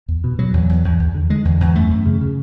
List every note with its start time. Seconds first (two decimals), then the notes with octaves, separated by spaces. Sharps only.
0.08 E2
0.24 B2
0.39 B2 F#3
0.54 E2
0.69 E2
0.84 E2
0.99 E2
1.15 D3
1.30 D3 G#3
1.45 E2
1.60 E2
1.75 F#2 A3
1.91 F#2
2.06 C#3
2.21 C#3